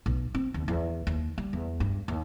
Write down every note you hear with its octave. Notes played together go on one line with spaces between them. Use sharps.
B1
C4
D#2
E2
D#2
G3
E2
G2
D#2